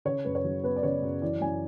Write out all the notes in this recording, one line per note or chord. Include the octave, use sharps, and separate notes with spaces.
C#3 C#5
F#2 B4
C#5
F#3
B3 B4
D5
C#3 C#5
F#2
E3 D5
F#2 G#5